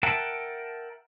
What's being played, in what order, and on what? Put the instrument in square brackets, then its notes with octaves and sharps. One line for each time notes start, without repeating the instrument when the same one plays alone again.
[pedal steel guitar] A#4 E5 F#5 G5 A5